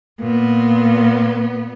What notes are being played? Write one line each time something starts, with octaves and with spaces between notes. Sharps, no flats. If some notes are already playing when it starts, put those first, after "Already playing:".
A#2 B3